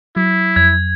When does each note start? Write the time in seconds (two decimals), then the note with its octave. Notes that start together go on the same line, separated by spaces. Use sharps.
0.16 F#3 E4
0.56 F2 G#6